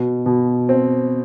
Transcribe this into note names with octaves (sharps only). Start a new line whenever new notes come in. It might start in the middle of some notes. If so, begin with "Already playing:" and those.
Already playing: B2
B2
C4